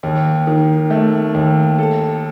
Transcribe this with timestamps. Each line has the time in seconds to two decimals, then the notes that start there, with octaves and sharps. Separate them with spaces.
0.03 D#2
0.47 D#3
0.90 A3
1.34 D#2
1.78 A4